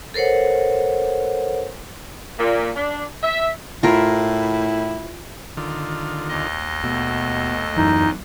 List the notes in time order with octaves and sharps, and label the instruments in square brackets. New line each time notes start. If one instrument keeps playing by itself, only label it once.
[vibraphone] A4 A#4 C5 C#5 F#5
[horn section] A#2
D4
E5
[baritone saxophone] A2 [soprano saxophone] E4 [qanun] F4 A#4
[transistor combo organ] D3 D#3 F4
[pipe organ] D#2 D#5
[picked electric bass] B2 [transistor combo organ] A3
[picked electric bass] F#2 E3 [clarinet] D#4